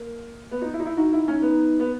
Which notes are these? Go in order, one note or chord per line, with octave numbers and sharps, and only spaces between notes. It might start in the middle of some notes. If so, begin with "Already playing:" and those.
Already playing: A#3
B3
D#4
E4
D#4
E4
D#4 F#4
E4
C#4
B3
B3